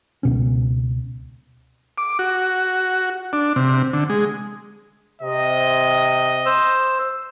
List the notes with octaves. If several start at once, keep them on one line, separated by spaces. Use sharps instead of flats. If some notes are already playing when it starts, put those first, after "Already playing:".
C#2 B2 C#4
D6
F#4
D4
C3
D3
G#3
C3 D#5
C5 E6